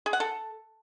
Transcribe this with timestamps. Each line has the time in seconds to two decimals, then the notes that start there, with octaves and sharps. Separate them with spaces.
0.06 G#4
0.13 F#5
0.20 A4